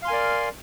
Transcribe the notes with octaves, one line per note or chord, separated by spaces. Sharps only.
A#4 D5 F5 G#5 C6